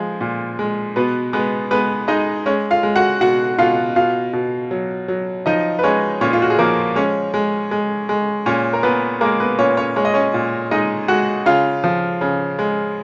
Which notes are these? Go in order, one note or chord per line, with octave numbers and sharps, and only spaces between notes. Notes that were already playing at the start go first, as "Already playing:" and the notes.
Already playing: F3 G#3
A#2
G#3
B2 B3 B4
G#3 B3 B4
G#3 B3 B4
G#3 D#4 D#5
G#3 C#4 C#5
F4 F5
G#3
F#4 F#5
B2 F#4 F#5
B2 F4 F5
B2 F4 F5
B2
F#3
F#3
F3 D#4 D#5
B4
G#3 C#4 C#5
A#2 C#4 C#5
F4
F#4
G#4
F3 A#3 A#4
G#3 C#4 C#5
G#3
G#3
G#3
A#2 C#4 C#5
A#4
A#2 B3 B4
G#3 A#3 A#4
B3 B4
A#2 C#4 C#5
C#4 C#5
G#3 C#5
D#5
C#4 C#5
A#2
G#3 D#4 D#5
G#3 F#4 F#5
C#3 F4 F5
F3
C#3
G#3